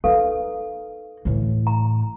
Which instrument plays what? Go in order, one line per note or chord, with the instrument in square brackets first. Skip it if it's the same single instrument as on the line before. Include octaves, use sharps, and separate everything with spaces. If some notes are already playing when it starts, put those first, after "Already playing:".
[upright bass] D#4 [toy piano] A4 B4 F5
[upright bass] A2 E3
[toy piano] A#5